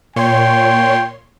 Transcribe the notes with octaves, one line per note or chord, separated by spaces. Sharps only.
A#2 C#5 G5 C6